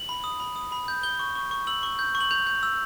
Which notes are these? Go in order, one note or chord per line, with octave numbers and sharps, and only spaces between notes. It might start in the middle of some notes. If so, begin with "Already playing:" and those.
Already playing: F#7
B5
D#6
B5
D#6
B5
G6
G6 G7
C#6
C#6
C#6
E6 F#7
C#6
G6
C#6
F#7
G6 F7
G6
E6